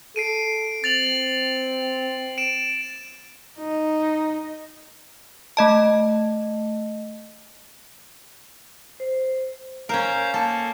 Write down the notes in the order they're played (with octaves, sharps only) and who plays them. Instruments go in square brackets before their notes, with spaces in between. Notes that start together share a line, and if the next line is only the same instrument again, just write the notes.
[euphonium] A4 [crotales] C7 D7 D#7
[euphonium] C4 [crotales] A6 F7 F#7
[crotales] D7 E7
[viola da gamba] D#4
[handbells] A3 D#5 A5
[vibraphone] C5
[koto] C#4 A#4 [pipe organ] C5 F5 A#5
[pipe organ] A#3 [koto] A4